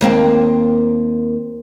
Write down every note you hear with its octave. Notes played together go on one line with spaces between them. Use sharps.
D#2 A#3 C4